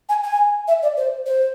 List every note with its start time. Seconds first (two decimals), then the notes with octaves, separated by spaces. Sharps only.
0.09 G#5
0.24 G#5
0.68 E5
0.83 D5
0.97 C5
1.26 C5